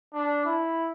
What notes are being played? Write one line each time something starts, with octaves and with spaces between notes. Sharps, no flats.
D4
E4